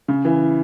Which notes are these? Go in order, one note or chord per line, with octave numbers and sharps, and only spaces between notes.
C#3
E3